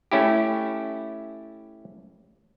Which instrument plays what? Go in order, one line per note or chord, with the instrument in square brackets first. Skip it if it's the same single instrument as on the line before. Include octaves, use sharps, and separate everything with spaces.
[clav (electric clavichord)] A3 C#4 E4 G4